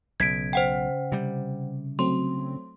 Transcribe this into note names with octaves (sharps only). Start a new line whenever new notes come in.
B1 C#3 G#6 B6 D7
C5 F#5 G5
C3 G3
F#3 A3 C4 C6